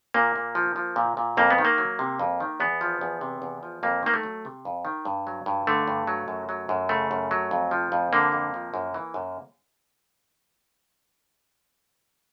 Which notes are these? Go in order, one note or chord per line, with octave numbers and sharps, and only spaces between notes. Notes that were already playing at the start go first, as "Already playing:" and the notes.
A#2 A#3
A#2
F3
F3
A#2
A#2
F2 A#3
B3
D#3
A#3
F#3
C3
F2
D#3
E2 B3
F3
E2
C3
E2
F3
F2 A#3
D#3 A#3
A3
F#3
C3
F2
D#3
G2
F#3
G2
D3 A3
G2
F#3
F#2
F#3
F#2
C#3 A3
F#2
F#3
F2
F3
F2
D3 A#3
F2
F3
F#2
E3
F#2